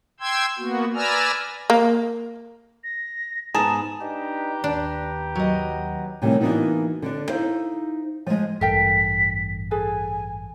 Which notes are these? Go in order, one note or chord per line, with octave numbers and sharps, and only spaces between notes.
G5 C6 E6 G#6
A#3 B3 F#4
B4 D5 G#5 A#5 E6 F6
A#3
A#6
G#2 B3 G#4 A5 A#5 E7
D4 D#4 G4 B4 A#5
D#2 D4
F#3 D#5
A2 C3 D#3 E3 G3
E3 A#3 B3 D4 D#4 F#4
D3 D4
D#4 E4 C5 F5
F3 G#3
A1 G2 A4 A#4 G5 B6
G#4 A4 B4 G#5